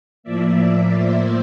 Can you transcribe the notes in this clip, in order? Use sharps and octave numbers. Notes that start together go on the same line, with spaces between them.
A2 F3 A#3 D5 E5
C5 D5